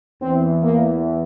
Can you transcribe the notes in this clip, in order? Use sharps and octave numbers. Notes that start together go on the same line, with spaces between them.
E2 E3 C4
A#3